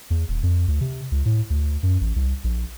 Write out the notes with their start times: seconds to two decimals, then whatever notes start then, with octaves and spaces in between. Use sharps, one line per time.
0.10 E2
0.29 D#1
0.43 F2
0.68 D2
0.81 C3
1.12 C#2
1.25 A2
1.50 D2
1.83 F#2
2.01 A1
2.16 C2
2.44 A#1